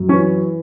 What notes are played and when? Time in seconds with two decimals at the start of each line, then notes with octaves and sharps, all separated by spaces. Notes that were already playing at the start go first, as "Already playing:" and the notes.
Already playing: F#2
0.08 E3 C#4